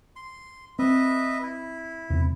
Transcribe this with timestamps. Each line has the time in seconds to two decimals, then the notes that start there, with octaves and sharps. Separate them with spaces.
0.16 C6
0.79 C4 B4 D#5 E5
1.43 E4
2.10 E2 C3